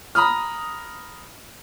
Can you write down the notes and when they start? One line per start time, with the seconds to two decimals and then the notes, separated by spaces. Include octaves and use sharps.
0.15 A#5 B5 D#6 F6